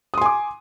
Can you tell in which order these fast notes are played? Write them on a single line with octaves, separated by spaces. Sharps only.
D#6 C6 G#5 D6